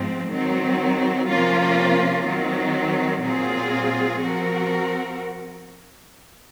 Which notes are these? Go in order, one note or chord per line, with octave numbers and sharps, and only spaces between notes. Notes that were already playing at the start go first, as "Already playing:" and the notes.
Already playing: G#2 F3 G#3 C4
D#3 F#3 C4
C3 F3 A#3 C#4 F4
D#3 F#3 C4
A#2 F#3 C4 F4 G#4
F3 C4 F#4 A#4